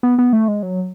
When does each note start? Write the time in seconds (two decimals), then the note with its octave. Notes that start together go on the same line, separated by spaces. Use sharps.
0.03 B3
0.18 B3
0.33 A3
0.48 G#3
0.63 F#3